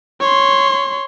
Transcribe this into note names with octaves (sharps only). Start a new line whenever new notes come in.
C#5 C6